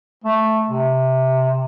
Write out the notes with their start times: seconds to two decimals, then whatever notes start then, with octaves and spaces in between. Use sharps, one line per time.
0.24 A3
0.69 C3